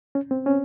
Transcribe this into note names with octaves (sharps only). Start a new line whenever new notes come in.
C#4
C4
C#4